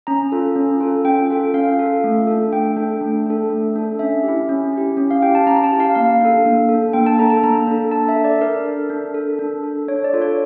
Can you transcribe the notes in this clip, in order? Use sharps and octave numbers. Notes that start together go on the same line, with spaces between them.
C#4 A#5
F4 A4
C#4
F4 A4
C#4 G5
F4 A4
C#4 F5
F4 A4
A3
D4 A4
A3 G5
D4 A4
A3
D4 A4
A3
D4 A4
C#4 E5
E4 G4
C#4
E4 G4
C#4
F5
E4 G4 G5
A5
C#4 A#5
A5
E4 G4
F5
A#3 F5
D4 A4
A#3
A4
D4
A#3 G5
A5
D4 A4 A#5
A5
A#3 A#5
D4 A4
D4 A5
E5
A4
D5
D4 A#4
A4
D4
A4
D4
A4
D4 C#5
D5
F4 A4
C#5